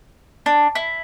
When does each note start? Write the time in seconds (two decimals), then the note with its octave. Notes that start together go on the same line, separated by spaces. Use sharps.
0.46 D4
0.75 E4